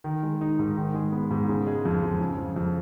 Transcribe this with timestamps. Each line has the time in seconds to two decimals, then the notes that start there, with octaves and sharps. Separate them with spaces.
0.04 D#3
0.23 G#3
0.41 D#4
0.59 G#2
0.77 D#3
0.94 G#3
1.12 B3
1.31 G#2
1.49 C#3
1.67 G#3
1.85 F2
2.03 F2
2.21 C#3
2.38 F3
2.56 F2